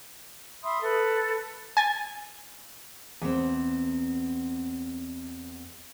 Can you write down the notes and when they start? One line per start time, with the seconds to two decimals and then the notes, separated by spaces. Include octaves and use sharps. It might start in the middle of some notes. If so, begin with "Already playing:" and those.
0.63 E5 B5 C6 D#6
0.81 A4 B4
1.77 G#5 A6
3.21 E2 C4